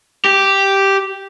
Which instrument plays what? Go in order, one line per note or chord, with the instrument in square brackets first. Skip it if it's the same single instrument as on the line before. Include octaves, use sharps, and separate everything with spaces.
[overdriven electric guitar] G4